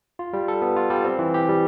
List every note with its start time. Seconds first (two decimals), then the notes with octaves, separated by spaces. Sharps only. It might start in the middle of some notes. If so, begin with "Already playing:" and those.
0.19 F4
0.33 G3
0.48 A4
0.62 B3
0.76 F4
0.90 G3
1.04 C4
1.19 E3
1.34 G4
1.49 G3